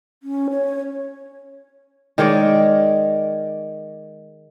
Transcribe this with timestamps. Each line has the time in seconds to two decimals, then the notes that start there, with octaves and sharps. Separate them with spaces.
0.23 C#4
0.50 C#5
2.18 D#3 G#3 C#5 D5